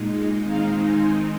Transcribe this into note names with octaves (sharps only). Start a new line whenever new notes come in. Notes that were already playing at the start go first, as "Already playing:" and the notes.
Already playing: A#2 G#3 D#4
D#3 G#3 C4 D#4 F5 A#5
G#5 C6